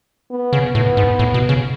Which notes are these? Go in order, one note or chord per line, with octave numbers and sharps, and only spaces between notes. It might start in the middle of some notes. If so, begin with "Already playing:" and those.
B3
C#3
A2 B3
G#2
A2
B2
C#3